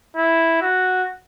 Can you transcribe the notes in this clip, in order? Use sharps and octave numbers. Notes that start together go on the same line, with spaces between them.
E4
F#4